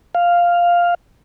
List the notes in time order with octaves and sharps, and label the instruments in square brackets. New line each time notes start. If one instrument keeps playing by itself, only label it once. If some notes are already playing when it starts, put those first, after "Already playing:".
[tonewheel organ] F5